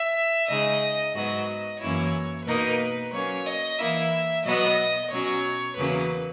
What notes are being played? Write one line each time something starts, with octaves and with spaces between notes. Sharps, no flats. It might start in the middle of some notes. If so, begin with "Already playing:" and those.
Already playing: E5
C#3 G#3 D#4 G#4 D#5
G#2 F#3 B3 F#4 D#5
F#2 E3 A#3 C#4 E4 C#5
B2 A#3 D#4 A#4 B4 D#5
F#3 A#3 C#4 C#5
D#5
E3 A#3 E4 E5
B2 F#3 B3 F#4 B4 D#5
B2 F#3 C#4 F#4 C#5
E2 C#3 F#3 A#3 C#4 B4